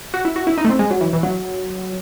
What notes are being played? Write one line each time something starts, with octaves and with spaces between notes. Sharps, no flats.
F#4
E4
F#4
E4
D#4
A3
C4
G#3
F#3
E3
E3
F#3